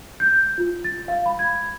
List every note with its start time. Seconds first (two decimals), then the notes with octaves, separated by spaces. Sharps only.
0.20 G6
0.58 F4
0.84 A6
1.08 F5
1.26 B5
1.39 G#6